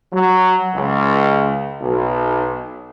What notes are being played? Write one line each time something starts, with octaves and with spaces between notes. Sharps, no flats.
F#3
C#2
B1